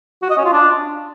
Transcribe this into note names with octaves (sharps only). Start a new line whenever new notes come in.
F#4
D#5
C#4
F4
D4